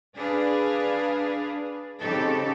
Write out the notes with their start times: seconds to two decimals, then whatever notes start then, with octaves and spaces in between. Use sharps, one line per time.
0.18 D4 G#4 B4 F5
2.00 C#3 C4 C#4 D#4 G4 A4